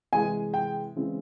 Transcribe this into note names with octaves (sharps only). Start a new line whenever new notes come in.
C3 E3 G#3 G#5
G5
C#3 E3 G#3 C4